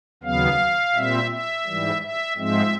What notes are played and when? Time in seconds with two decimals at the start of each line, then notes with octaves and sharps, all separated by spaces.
0.23 D#2 C#3 F#3 B3 F5
0.95 A#2 G3 C4 E5
1.31 E5
1.67 G#2 E3 G3
2.02 E5
2.37 G#2 F3 G#3 C4 E5